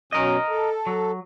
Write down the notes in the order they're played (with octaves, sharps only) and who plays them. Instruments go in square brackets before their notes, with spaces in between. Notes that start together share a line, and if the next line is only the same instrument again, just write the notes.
[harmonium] B2 F#3 C#4 [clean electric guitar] A#4 D#5
[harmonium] A4
[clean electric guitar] F#3